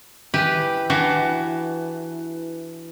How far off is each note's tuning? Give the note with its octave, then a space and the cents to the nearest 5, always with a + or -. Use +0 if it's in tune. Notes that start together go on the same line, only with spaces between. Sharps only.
E3 +0 G4 +0 B4 +0
E3 +10 D4 +0 F#4 +25